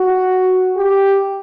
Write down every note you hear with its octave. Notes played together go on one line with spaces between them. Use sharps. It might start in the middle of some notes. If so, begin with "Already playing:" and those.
Already playing: F#4
G4